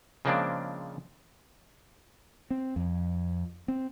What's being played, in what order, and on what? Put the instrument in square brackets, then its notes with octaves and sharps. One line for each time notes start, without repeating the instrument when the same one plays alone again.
[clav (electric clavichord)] C#3 F3 G#3 A#3 C4 D4
[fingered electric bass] C4
F2
C4